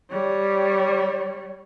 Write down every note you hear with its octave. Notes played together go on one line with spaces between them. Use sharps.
G3 C#5